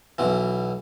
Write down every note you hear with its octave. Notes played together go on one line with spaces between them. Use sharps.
B1 B2 E3